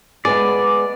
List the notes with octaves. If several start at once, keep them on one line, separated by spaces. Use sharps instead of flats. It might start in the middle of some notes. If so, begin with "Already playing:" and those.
G#3 B3 G#4 D5